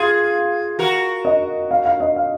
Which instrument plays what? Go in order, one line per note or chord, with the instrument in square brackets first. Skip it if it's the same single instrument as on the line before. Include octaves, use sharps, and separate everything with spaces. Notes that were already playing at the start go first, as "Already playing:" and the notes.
Already playing: [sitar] F4 G#4 [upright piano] F5
[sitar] F#4 A#4
[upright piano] D#5
F5
F5
D#5
F5